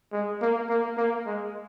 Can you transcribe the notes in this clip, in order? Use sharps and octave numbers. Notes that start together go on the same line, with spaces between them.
G#3
A#3
A#3
A#3
G#3